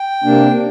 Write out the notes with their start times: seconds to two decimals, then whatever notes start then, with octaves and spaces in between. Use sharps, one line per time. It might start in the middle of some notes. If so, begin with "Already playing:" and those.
Already playing: G5
0.24 C3 A#3 D4